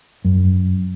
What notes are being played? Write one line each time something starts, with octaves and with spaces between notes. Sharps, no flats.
F#2